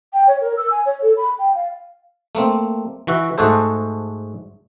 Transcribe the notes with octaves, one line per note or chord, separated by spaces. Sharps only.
G5
C#5
A#4
E6
G#5
C#5
A4
B5
G5
F5
A3 A#3 C4
E3 F#4 E5
G#2 A3 F#4 G#4 A4 C5